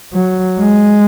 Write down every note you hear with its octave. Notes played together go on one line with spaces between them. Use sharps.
F#3
G#3